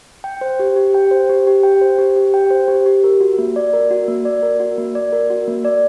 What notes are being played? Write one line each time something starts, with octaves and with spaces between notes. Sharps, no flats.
G5
C5
G4
G4
G5
C5
G4
G4
G5
C5
G4
G4
G5
C5
G4
G4
A#4
F#4
A#3
D5
A#4
F#4
A#3
D5
A#4
F#4
A#3
D5
A#4
F#4
A#3
D5